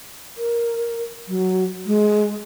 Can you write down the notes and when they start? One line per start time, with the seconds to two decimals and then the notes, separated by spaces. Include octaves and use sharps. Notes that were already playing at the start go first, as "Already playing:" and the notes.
0.37 A#4
1.28 F#3
1.86 G#3